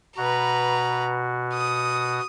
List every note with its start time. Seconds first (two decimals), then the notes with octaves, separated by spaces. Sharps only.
0.17 B2 F#4 B4 A#5
1.54 D#6